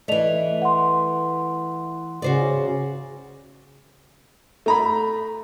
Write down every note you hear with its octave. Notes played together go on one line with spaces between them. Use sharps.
E3 A3 D5 D#5 F7
F#5 C6
C#3 F#4 C5 D5
A3 A#5 B5